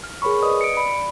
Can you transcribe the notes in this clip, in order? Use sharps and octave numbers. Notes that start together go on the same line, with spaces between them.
F6
G#4 A#4 C#5 B5 C#6
B4 D5 D#5 D#6
C#7 D7
D5 B5